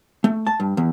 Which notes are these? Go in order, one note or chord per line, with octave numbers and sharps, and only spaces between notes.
A3
A5
G2
E2